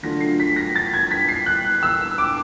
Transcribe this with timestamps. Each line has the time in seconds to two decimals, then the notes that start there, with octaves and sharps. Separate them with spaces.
0.03 D3 F#3 A3 D4 F4 A#6
0.21 C7
0.40 B6
0.56 A#6
0.76 A6
0.94 G#6
1.11 B6
1.28 C7
1.46 F#6
1.83 E6
2.18 D6